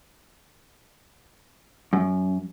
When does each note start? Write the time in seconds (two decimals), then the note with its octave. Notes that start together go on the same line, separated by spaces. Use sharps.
1.93 F#2